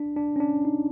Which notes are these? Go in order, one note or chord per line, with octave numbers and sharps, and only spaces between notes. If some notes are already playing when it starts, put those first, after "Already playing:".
Already playing: D4
D4
C#4
D4
D#4